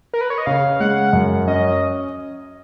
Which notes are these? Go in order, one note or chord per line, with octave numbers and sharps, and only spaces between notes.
A#4
B4
C#5
D#5
C#3 F5
G#3 F#5
F#2
C#4 D#5